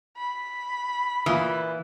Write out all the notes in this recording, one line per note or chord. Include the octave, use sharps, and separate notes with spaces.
B5
A#2 E3 F4 D#6